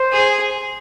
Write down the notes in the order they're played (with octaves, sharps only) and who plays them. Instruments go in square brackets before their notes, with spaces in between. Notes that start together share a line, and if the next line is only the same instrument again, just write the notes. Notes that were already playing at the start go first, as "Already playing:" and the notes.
Already playing: [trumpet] C5
[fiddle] G#4